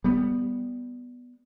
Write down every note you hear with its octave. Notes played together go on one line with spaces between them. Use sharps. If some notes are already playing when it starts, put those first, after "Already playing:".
G3 B3